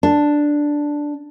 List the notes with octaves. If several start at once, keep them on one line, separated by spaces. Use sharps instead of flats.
D4